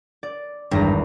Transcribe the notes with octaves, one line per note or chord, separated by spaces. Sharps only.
D5
G#1 E2 G2 A#5